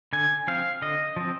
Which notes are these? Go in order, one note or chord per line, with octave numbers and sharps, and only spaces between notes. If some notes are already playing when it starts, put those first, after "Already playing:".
D3 G#5
F3 C4 F5
D3 D#5
F3 C4